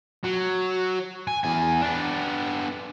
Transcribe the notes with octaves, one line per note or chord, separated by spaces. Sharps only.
F#3
G#5
E2 G#5
B3 D4